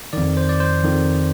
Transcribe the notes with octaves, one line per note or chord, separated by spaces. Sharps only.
F2 D#3 D5
C5
D5
C5
F2 D#3